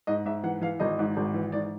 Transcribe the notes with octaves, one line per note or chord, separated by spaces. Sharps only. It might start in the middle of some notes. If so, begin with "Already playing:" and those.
G#2 D#5
G#2 E5
E3 F#5
E3 F5
G#1 D#5
G#2
G#1
E3
G#2 D5